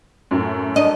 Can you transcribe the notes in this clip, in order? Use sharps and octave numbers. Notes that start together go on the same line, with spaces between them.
F#2 A2
D4 D#5